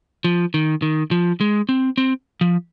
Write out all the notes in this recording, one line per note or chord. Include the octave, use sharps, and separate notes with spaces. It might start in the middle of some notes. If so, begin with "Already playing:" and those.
F3
D#3
D#3
F3
G#3
C4
C4
F3